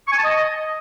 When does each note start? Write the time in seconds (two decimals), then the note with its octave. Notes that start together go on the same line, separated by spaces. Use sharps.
0.06 C#6
0.12 G#5
0.18 A5
0.24 D#5